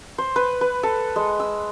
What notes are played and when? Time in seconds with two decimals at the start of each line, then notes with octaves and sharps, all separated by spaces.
0.18 C5
0.36 B4
0.61 B4
0.83 A4
1.16 G#3
1.40 E6